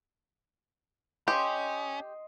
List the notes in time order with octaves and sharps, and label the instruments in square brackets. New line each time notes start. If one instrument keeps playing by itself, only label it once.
[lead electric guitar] C#4 [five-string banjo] G4 [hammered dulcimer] D#5 C6